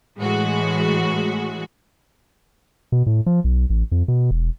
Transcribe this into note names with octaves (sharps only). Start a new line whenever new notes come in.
A2 E3 G#3 F#4
B2
A2
F3
B1
A1
F2
B2
E1